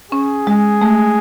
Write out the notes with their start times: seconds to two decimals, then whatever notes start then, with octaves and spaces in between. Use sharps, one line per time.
0.11 C#4 G#4
0.47 G#3
0.81 A3